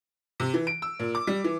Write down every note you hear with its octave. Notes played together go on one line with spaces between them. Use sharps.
C3
E3
D7
E6
A#2
D6
G3
E3